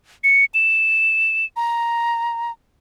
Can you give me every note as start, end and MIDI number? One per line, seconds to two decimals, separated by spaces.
0.24 0.45 97
0.54 1.45 100
1.56 2.51 82